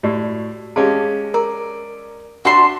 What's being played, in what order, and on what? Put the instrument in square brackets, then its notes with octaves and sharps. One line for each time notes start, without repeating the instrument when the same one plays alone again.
[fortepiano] A2 [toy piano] F#4 G4 D5
[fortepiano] G#3 C#4 G4 [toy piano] G#4 F5 A5
[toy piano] A#4 A#5 E6 [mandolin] D5
[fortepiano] D4 F#4 [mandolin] E5 A5 C6